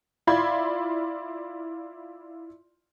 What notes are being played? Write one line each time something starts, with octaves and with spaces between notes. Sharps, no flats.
E4 F4 D5 B5 C6 G#6